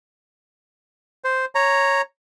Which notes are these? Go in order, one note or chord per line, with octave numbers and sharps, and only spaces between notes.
C5
C#5 A#5